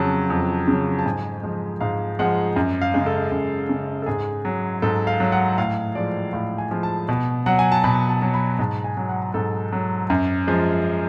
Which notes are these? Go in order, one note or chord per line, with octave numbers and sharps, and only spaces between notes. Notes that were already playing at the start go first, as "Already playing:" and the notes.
Already playing: F2 C#3 F#3 A5
F2
C#3 F#3
A5
G#2 G#5
F3 G#3
G#2 F5
F3 G#3 F#5
F#2
F5
C#3 G#3
A4
F#2
C#3 G#3
A4
G#2 G#4
F#3
G#2 A4
F5
F#3
F#5
A2 F5
F3 G#3 D5
A2 F5
G#5
F3 G#3
A5
B2
F#3 F#5
G#5
A5
B2 B5
A5
F#3
B5
G#2 A5
G#5
F#3
F#5
G#2 A4
F#3
F#2
F3 G#3